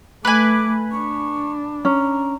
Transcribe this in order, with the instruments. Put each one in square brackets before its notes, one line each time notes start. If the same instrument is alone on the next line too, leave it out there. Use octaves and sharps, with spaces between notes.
[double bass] A3 [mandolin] B4 G#5 [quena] D6
[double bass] D4 [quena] C#6
[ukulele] C#4 [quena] A#5